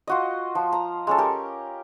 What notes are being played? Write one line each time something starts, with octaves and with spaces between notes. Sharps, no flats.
F4 F#4 D#5
F3
A#5
G#3 C#4 A4
G4 A#4